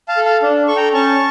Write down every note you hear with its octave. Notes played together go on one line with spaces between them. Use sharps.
F5 A5
A4
F5 A5
D4
A4 C#6
G5 A#5
C#4 A5 C#6